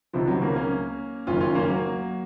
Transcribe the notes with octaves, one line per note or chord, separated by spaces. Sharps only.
C#2 C3 D#3 F3
F#3
A#3 C#4
A#3 C#4
F#1 F#2 D#3 C#4 F4
C#4 F4
A#3 C#4
F#3 A#3